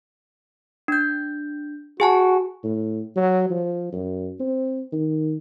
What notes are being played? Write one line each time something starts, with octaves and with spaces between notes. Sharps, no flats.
D4 G6
F#4 G#4 G#5 A5
A2
F#3
F3
F#2
C4
D#3